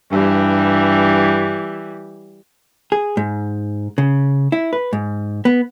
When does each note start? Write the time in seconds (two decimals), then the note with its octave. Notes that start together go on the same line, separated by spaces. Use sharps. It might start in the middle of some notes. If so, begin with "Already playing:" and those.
0.12 G2 E3 G3
2.92 G#4
3.17 G#2
3.98 C#3
4.52 E4
4.73 B4
4.93 G#2
5.45 B3